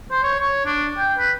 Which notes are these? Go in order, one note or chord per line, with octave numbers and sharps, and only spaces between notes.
C5
C#5
C#5
D4
G5
B4